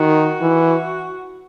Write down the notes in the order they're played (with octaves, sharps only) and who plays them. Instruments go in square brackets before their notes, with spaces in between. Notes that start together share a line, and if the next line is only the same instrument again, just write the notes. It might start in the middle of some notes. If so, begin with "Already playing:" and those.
Already playing: [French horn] D#3 [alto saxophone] F#4
[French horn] E3